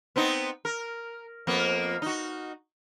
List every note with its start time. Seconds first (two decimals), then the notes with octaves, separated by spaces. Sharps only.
0.16 B3 C4 D#4
0.65 A#4
1.47 F2 A#3 B3
2.02 D#4 F#4